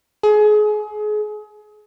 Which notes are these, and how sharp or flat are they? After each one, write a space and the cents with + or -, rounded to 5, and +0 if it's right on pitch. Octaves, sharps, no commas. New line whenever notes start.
G#4 +30